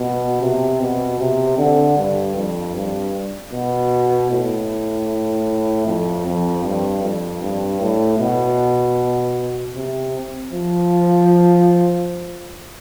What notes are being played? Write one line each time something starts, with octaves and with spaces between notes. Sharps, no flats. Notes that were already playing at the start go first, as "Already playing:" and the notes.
Already playing: B2
C3
B2
C3
D3
G2
F2
G2
B2
A2
F2
F2
G2
F2
G2
A2
B2
C3
F3